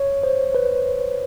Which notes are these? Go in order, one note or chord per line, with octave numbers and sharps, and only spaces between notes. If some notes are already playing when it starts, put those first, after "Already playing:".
Already playing: C#5
C5
B4